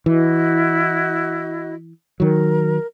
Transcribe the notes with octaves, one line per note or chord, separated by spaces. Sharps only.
E3 E4 F#4 D#5
D#3 F#3 A#4